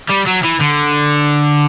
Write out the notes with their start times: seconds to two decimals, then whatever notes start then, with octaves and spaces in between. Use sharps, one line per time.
0.09 G3
0.26 F#3
0.44 E3
0.60 D3